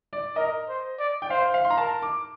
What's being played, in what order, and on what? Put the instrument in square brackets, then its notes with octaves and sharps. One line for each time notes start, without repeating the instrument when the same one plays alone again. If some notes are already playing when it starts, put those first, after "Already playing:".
[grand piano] D5
[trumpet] A#4 [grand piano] D#5
[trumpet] C5
D5
[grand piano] G5
[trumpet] C5 [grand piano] F5
[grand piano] F5
C6
A#5
[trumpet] A#4 [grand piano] A5
[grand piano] D6